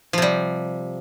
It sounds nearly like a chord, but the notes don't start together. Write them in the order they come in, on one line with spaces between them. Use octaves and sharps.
F3 C3 G3